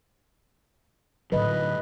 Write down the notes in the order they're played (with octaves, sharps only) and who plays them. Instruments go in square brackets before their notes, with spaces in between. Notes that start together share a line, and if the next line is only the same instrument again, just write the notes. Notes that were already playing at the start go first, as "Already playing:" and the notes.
[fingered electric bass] A2 D3 F#3 [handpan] B4 D#5